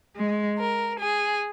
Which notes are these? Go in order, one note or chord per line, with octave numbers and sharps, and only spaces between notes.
G#3
A#4
G#4